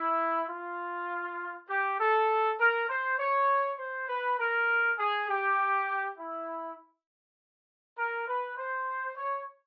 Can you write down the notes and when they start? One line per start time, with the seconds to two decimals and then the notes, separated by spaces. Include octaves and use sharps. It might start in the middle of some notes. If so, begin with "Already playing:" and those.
Already playing: E4
0.50 F4
1.70 G4
1.99 A4
2.60 A#4
2.89 C5
3.19 C#5
3.79 C5
4.08 B4
4.39 A#4
4.98 G#4
5.29 G4
6.18 E4
7.98 A#4
8.28 B4
8.57 C5
9.17 C#5